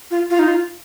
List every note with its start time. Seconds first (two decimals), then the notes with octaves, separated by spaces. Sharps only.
0.11 F4
0.30 F4
0.39 D#4
0.48 F4